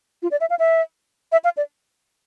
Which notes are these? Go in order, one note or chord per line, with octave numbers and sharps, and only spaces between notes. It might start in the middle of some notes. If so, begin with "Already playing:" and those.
F4
D5
E5
F5
E5
E5
F5
D5